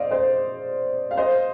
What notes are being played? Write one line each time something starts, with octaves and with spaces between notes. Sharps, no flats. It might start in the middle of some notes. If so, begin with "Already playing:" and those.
Already playing: C5 D5 D#5 F5
C5 D#5
F5
C5 D#5